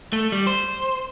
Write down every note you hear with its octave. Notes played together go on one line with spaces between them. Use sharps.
A3
G3
C5